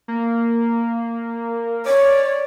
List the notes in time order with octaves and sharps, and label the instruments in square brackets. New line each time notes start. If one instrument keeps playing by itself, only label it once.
[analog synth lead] A#3
[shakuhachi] C#5 [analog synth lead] D5